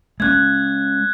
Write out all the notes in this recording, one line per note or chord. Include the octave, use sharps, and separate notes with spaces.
G#3 A3 C#4 F#6 G#6